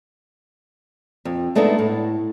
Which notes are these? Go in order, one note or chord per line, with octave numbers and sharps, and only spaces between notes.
F2
G#3 A3 B3 D4 D#4
A2